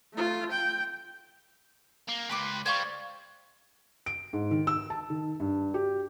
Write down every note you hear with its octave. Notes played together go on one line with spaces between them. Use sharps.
A3 F4
G5
A#3
C#2 B4 G5 C6 D6
G3 C5 F5 C#6 G#6
D7
G#2
D#3
E6
A5
D#3
G2
G4